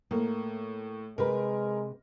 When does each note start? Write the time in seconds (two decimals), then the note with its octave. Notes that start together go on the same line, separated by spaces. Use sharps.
0.11 A2 A#3
1.18 C3 G#3 A#4 B4